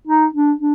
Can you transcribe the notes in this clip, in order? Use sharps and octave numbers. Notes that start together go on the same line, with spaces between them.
D#4
D4
D4